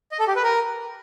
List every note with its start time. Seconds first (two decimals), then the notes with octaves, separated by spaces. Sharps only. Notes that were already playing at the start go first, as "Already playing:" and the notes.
0.12 D#5
0.20 A4
0.28 G4
0.36 B4
0.44 A#4